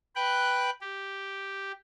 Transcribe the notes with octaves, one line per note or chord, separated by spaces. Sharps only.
B4 G5 F#6
G4